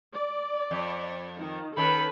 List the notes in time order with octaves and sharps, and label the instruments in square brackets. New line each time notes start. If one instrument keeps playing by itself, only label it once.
[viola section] D5
[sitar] F2
[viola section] D#3
[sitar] D#3 C#4 [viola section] A4 B4 [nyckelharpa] B5